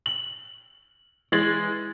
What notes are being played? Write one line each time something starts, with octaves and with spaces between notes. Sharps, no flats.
F#7
E3 G#3 G#6 A6 F#7